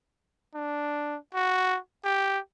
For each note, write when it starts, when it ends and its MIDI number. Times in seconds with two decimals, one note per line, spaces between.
0.54 1.17 62
1.34 1.78 66
2.05 2.39 67